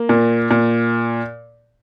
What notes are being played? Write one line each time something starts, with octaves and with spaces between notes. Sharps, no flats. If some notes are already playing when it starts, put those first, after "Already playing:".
Already playing: A#3
A#2
A#2